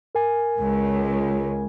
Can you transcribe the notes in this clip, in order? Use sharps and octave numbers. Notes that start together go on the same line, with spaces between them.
A#4 G#5
C#2